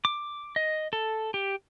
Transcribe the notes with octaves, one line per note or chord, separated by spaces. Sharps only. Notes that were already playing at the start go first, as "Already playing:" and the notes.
D6
D#5
A4
G4